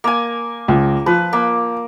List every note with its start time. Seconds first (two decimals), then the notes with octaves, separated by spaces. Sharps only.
0.04 A#3 G#5
0.68 C#2
1.06 F3 B4
1.33 A#3